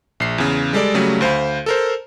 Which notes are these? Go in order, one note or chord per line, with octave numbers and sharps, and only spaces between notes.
A#1 C7
E2 C#3
G3 G#3 A4 D5
C#3 F#3 G3 A3
D2 C5 F5 B5
A4 A#4 C5